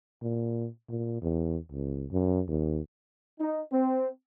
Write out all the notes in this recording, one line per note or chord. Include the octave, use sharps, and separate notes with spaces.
A#2
A#2
E2
C#2
F#2
D#2
D#4
C4